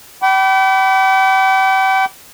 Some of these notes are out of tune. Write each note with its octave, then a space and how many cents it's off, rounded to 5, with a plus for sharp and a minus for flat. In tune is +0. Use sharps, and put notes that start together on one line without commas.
G5 -40 B5 +10 D6 -25